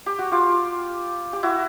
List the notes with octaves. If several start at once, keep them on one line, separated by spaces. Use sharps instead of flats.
G4
F#4
F4 G4
G4
E4 F#4